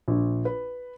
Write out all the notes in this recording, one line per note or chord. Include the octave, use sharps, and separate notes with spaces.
A#1
B4